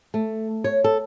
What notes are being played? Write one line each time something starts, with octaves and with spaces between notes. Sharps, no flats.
A3
C#5
A4